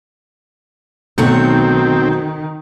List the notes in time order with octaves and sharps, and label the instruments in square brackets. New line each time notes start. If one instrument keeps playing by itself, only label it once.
[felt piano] B1 [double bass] D#3 [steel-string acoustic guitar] F#3 A3 F#4 [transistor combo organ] C4